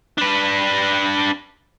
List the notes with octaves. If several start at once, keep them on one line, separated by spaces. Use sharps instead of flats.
D4 B4